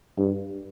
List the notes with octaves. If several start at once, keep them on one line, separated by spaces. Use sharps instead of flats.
G2